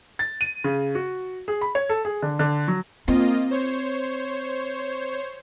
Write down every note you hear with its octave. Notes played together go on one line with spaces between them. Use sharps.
A6
D#7
C#3
F#4
G#4
B5
C#5
A4
G#4
D3
D3
F#3
A#3 C4 F4 D#5
C5 C#5